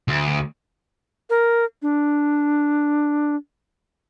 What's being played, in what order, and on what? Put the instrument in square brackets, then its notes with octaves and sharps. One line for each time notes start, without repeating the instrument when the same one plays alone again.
[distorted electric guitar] D2
[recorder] A#4
D4